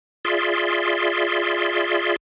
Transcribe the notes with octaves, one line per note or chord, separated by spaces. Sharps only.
F4 G#4 D5 E5 C6